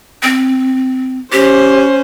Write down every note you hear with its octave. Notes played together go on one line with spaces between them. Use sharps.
C4
C#4 G4 C5